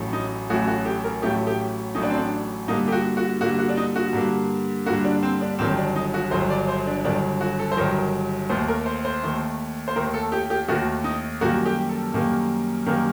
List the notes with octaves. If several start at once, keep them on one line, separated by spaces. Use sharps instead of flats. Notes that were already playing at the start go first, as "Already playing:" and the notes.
Already playing: A1 A2 F#3 A3
D#4
A1 A2 F#3 A3 F#4
F#4
G4
A#4
A1 A2 F#3 A3 G4
G4
A1 A2 F#3 A3 D#4
D4
C4
D4
G2 D3 G3 A#3 D#4
G4
F#4
F#4
G2 D3 G3 A#3 F#4
F#4
D4
D#4
F#4
G2 D3 G3 A#3
G2 D3 G3 A#3 F#4
D4
C4
D4
G1 G2 D#3 F#3 C4
D4
D#4
F#4
G1 G2 D#3 F#3 C5
D5
C5
D4
G1 G2 D#3 F#3 D4
F#4
A4
C5
G1 G2 D#3 F#3 A#4
D#2 D#3 A3 C5
A#4
C5
C5
D#2 D#3 A3
C5
D#2 D#3 A3 A#4
A4
G4
G4
D#2 D#3 A3 F#4
D#4
F#2 D#3 G3 A#3 F#4
G4
A4
F#2 D#3 G3 A#3
F#2 D#3 G3 A#3